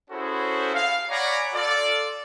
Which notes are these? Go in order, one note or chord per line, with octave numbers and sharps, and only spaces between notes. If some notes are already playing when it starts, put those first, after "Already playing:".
C#4 E4 F#4 G#4 A4 C5
F5
C#5 D5 F#5 G#5 A#5 B5
F4 A4 D5